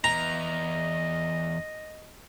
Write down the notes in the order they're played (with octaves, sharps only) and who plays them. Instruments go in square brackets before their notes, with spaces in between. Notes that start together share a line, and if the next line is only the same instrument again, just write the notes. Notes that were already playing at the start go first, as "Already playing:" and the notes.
[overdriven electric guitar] E2 [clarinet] D#5 [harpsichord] A#5